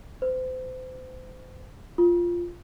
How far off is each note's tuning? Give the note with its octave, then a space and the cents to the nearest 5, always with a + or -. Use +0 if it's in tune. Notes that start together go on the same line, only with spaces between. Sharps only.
C5 -35
F4 -5